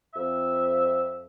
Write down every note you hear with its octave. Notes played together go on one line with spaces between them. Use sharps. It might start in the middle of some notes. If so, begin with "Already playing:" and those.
F2 E5